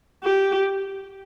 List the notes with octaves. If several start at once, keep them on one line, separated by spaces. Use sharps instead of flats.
G4